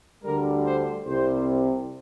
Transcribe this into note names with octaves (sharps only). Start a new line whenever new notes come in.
D2 D3 G3 A#4
C5
C2 C3 G3 C5